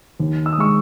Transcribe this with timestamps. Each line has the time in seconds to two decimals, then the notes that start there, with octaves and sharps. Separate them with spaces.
0.20 D#2
0.46 E6
0.53 D#6
0.58 G#3 C#6 E6